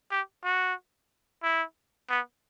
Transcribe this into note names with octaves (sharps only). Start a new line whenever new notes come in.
G4
F#4
E4
B3